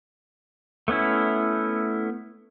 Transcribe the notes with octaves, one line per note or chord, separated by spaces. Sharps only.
A3 B3 C#4 E4